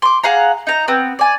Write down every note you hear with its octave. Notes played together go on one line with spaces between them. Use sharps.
C6 D6
G#4 F5 F#5 A#5
D#4 A#5
B3 C4
D5 G#5